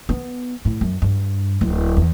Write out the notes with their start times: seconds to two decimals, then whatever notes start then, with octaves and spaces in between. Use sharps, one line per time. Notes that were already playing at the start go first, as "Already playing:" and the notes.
0.09 B3
0.65 A2
0.81 F#2
1.02 G2
1.61 D1
1.97 E2